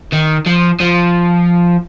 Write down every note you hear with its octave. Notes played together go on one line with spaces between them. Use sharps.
D#3
F3
F3